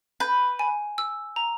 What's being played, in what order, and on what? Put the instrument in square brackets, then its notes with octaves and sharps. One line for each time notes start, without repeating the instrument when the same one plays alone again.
[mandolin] B4 [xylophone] G6
[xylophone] G#5
E6
A#5